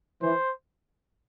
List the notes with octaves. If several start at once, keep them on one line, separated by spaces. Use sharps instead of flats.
E3 C5